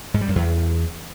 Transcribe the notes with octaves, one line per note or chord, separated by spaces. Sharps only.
G#2
G3
F#2
E2